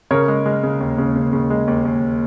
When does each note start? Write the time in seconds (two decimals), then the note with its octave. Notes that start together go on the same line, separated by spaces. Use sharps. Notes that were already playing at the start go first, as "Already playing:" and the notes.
0.11 C#3 A#4 C#5
0.28 G#3
0.46 G#3
0.63 C#3
0.80 D#2
0.98 C#3
1.16 C#3
1.33 C#3
1.50 G#3
1.67 D#2
1.85 D#2